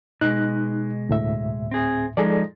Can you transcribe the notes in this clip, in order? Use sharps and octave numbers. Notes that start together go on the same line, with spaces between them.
B2 G#3 D#4 F#6
D2 A2 E5
C4 G#4
F3 G#3 D#4 G#4 A4 D5